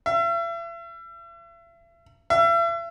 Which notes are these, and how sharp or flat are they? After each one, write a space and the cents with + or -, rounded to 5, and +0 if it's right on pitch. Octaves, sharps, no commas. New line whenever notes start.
E5 +40
E5 +40